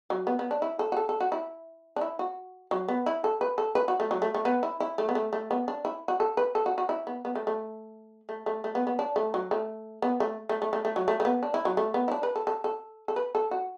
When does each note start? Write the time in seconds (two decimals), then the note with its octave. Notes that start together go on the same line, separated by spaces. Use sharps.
0.10 F#3
0.27 B3
0.39 B3
0.51 D4
0.62 E4
0.79 A4
0.92 F#4
0.97 A4
1.09 A4
1.20 F#4
1.32 E4
1.96 D4
2.01 E4
2.19 F#4
2.71 F#3
2.88 B3
3.06 E4
3.24 A4
3.41 B4
3.58 A4
3.75 B4
3.88 F#4
4.00 A3
4.11 F#3
4.22 A3
4.34 A3
4.45 B3
4.63 E4
4.80 E4
4.98 A3
5.09 B3
5.15 A3
5.33 A3
5.51 B3
5.68 D4
5.85 E4
6.08 F#4
6.20 A4
6.37 B4
6.55 A4
6.66 F#4
6.78 F#4
6.89 E4
7.07 B3
7.25 B3
7.35 A3
7.47 A3
8.29 A3
8.46 A3
8.64 A3
8.75 B3
8.87 B3
8.99 D4
9.16 A3
9.34 F#3
9.51 A3
10.02 B3
10.20 A3
10.49 A3
10.62 A3
10.73 A3
10.85 A3
10.96 F#3
11.08 A3
11.20 A3
11.25 B3
11.43 D4
11.54 E4
11.65 F#3
11.77 A3
11.94 B3
12.08 E4
12.11 D4
12.23 B4
12.36 A4
12.47 A4
12.64 A4
13.08 A4
13.16 B4
13.35 A4
13.51 F#4